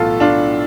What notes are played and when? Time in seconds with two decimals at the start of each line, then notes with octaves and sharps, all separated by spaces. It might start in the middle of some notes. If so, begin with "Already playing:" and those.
Already playing: B1 A2 E3 B3 F4 A4
0.20 D4 F4